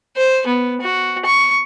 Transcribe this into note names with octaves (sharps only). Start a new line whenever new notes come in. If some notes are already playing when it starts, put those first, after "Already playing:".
C5
B3
F#4
C#6